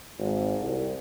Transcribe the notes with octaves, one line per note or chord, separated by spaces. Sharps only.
G#1
C2